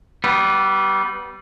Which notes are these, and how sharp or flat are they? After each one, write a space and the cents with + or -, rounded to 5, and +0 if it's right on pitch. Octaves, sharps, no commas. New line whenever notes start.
G3 -25 B3 -5